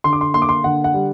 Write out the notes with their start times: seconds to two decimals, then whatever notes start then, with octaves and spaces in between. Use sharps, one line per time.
0.04 D3 C6
0.13 D6
0.21 C6
0.34 A#3 C6
0.42 D6
0.49 C6
0.64 D3 F#5
0.84 F#5
0.94 G3